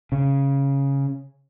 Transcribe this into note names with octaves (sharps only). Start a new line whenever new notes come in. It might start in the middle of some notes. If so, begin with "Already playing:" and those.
C#3